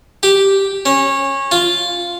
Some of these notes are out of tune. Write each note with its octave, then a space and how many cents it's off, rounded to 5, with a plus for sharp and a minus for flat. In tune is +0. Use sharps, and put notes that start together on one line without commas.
G4 -5
C#4 -20
F4 +0